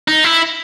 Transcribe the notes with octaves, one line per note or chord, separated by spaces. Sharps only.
D#4
E4